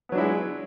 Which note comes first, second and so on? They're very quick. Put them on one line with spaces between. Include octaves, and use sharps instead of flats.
B3 F#3 D4 E4 G#3